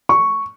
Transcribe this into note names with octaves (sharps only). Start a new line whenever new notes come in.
C#6